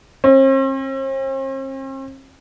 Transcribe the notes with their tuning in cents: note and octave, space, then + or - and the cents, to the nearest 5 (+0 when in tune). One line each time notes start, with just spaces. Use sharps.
C4 +45